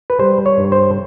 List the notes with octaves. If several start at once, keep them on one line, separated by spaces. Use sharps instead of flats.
B4
G3 C5
C#5
G2
C5